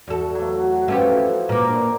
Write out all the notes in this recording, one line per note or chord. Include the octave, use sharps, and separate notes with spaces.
E2 F#4 A4
F#3 A3
E3 F3 A3 C4 C#4 G4
A#2 A#3 A#4 B4 D6
D4